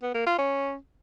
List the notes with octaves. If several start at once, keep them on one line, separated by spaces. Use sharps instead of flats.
B3
A#3
F4
C#4